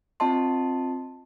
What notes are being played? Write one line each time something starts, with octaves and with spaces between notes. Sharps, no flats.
C4 F4 D#5 A5 C6